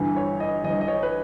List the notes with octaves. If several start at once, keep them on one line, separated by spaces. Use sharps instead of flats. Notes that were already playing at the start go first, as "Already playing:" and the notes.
Already playing: G1 G2 E3
C#5
D#5
G1 G2 E3 D#5
D#5
C#5
B4